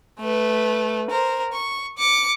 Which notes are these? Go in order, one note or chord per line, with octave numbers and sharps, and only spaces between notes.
A3 B4
A#4 C5
C#6
D6 C#7